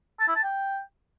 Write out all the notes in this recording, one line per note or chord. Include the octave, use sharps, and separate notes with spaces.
A5
E4
A5
G5